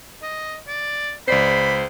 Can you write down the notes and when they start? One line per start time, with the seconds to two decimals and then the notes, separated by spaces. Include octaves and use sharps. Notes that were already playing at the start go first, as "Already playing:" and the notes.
0.23 D#5
0.68 D5
1.28 C#2 C5 D5 B5 C7